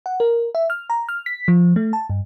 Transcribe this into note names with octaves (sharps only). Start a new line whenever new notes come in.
F#5
A#4
E5
F6
A#5
F6
B6
F3
A3
A5
G2